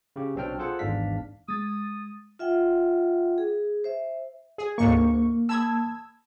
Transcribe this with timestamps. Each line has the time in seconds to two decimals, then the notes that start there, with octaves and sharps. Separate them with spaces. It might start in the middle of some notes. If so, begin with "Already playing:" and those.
0.16 C#3 G4
0.35 B1 F#3 C4 D4 G5 F6
0.58 F4 G#4 A4 C5 F#5
0.79 G#1 E2 G#2 D4 F5 B6
1.48 G#3 D#6 A6
2.39 F4 E5 F#5 G5
3.38 G#4
3.84 C5 E5
4.58 G#4
4.78 D2 G#2 A#3 C#6
5.49 A5 B5 D#6 E6 G#6